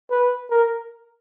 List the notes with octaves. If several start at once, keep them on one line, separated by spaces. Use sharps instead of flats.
B4
A#4